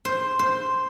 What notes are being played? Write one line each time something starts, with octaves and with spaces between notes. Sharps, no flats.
C5
C5